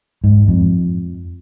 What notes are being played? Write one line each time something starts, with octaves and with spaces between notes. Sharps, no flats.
G#2
F2